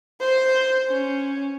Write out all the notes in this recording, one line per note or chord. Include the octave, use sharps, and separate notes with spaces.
C5
C#4